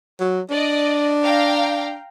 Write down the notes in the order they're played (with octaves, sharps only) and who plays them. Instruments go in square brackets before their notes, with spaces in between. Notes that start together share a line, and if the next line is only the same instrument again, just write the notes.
[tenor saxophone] F#3
[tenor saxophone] D4 [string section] D5 D#5
[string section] F5 G5 A#5